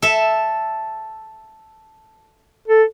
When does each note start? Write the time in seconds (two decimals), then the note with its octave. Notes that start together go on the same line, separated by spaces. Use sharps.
0.02 A4 E5
2.68 A4